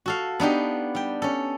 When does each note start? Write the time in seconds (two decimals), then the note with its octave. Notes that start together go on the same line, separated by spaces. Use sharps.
0.06 F#4 A4 F5
0.40 B3 D4 D#4 G4
0.95 G3 G5
1.22 C#4 A4